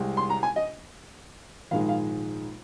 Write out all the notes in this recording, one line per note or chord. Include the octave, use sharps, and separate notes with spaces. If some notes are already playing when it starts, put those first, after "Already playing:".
Already playing: C2 C3 G#3
C6
A#5
G#5
D#5
A#1 G#2 D#3 G#3 F5
F5